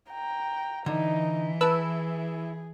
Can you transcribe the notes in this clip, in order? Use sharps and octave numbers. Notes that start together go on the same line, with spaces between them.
G5 A#5
D3 E3 D#4
E4 G#4 B4 A5 E6